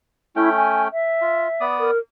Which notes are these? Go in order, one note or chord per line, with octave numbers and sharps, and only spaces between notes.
A3 C#4 E4 G5
G#5
E5
F4
B3 D5 D#6
A#4